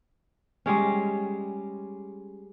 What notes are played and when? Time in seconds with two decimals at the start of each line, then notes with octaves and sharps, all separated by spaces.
0.66 G3 G#3 C#4